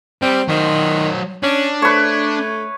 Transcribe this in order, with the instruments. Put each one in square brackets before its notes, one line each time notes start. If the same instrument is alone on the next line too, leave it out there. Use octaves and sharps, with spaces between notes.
[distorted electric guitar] G3 [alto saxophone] C4
[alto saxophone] D#3 [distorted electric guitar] F#3 C5
[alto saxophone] C#4 [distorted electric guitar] D4
[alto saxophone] A3 [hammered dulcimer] B4 C#5